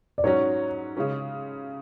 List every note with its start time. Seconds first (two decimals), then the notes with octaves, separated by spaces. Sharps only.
0.18 D5
0.24 G#2 F#3 C#4 F#4 C#5
0.97 C#3 G#3 C#4